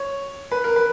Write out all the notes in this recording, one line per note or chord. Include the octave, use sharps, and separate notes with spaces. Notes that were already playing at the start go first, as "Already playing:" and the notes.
Already playing: C#5
B4
A#4
B4